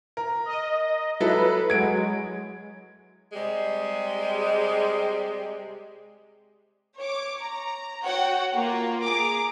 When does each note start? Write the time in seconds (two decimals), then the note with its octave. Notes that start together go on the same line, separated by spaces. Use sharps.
0.17 A#4
0.46 D#5
1.20 F#3 E4 A4 B4
1.70 F#3 G#3 G#6 D7
3.33 C3 G3 G#3
6.99 C#5 D6
7.42 A#5
8.03 F#4 C#5 F#5 G5
8.54 A#3 F4
9.01 G#4 A#5 D6